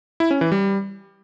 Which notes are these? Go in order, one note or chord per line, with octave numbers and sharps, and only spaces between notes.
E4
C#4
E3
G3